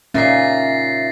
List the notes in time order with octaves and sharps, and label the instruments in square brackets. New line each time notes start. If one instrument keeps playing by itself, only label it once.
[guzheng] A#2 D#4 G#5 [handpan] C#4 [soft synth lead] E5 [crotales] A6 A#6 C7